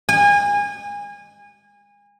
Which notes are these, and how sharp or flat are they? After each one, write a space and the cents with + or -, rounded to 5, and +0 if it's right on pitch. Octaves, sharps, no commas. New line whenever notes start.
G#5 -30